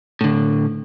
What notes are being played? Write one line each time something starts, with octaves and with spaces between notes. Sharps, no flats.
A2 D3